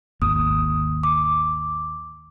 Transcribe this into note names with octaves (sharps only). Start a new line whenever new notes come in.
G#1 D#2 D#6
D6